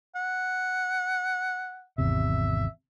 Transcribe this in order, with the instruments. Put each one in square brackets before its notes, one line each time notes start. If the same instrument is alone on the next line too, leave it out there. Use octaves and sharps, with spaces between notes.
[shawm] F#5
[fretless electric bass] G#1 E2 C3 [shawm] E5